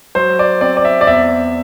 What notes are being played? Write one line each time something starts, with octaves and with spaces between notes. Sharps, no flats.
F#3 C5
D5
C4 D5
D5
E5
D5
E2 E5